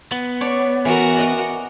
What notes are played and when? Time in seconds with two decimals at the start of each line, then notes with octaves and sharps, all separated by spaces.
0.12 B3
0.41 C#5 D5 A5
0.85 E3 F#4 A#4
1.17 D5 D#5 F#5